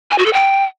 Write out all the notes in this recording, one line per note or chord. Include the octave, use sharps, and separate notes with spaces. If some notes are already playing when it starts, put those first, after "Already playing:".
G#5
F#4
A4
G5